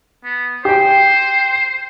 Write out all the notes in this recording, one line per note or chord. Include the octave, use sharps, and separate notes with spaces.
B3
G4 C5 G5